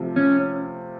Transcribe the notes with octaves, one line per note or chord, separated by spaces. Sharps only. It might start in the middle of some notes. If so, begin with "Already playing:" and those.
Already playing: C3 F3 A3
C#4